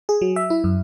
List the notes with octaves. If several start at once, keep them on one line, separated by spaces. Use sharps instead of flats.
G#4
F#3
E5
E4
F#2